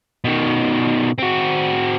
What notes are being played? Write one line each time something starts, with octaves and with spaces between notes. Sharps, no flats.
B2 D#3
C4 F#4